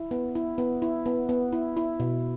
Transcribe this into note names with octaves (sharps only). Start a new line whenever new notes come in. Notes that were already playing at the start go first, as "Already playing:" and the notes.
Already playing: E4
B3
E4
B3
E4
B3
B3
E4
E4
B2